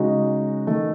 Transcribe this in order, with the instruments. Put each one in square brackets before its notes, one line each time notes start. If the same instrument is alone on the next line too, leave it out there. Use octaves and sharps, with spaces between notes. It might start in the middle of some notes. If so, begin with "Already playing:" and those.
Already playing: [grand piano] C#3 G#3 D#4 F#4
D#3 A3